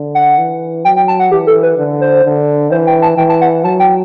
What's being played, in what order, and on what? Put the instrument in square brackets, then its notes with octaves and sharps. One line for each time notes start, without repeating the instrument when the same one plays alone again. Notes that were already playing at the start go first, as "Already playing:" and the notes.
Already playing: [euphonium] D3
[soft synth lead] F#5
[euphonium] E3
[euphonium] F#3 [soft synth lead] G5
[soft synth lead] G5
A5
F#5
[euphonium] E3 [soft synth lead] G4
[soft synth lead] A4
B4
[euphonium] D3
[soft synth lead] C5
[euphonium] D3
[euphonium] E3 [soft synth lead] C5
[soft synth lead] G5
A5
[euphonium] E3 [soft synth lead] G5
[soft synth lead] A5
F#5
[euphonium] F#3 [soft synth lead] A5
[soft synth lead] G5